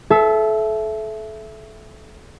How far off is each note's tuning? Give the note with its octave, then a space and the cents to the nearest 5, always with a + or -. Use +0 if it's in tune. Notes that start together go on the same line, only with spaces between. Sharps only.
A4 -30 E5 +10